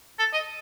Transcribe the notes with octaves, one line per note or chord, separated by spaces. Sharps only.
A4
D#5